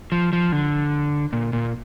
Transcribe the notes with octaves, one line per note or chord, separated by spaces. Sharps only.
F3
F3
D3
A#2
A#2